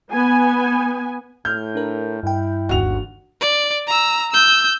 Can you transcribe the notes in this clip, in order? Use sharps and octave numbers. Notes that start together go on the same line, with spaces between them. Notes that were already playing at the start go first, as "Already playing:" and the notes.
B3 G#5
A2 F6 G6
D4 A#4
G2 E4 G5
G1 D#2 F#4 F7
D5
A#5 E6
E6 G6